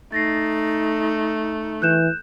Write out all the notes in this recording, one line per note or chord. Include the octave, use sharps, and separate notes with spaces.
A3 D#4 A6 A#6 C7
E3 F#6 G6 E7